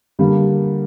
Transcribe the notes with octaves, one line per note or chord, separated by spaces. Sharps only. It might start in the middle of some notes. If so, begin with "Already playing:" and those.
D3 G3 A#3